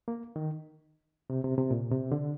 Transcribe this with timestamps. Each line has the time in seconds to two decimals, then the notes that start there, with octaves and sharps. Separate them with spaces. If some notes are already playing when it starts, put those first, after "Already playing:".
0.08 A#3
0.36 D#3
1.30 C3
1.44 C3
1.58 C3
1.71 A#2
1.92 C3
2.12 D3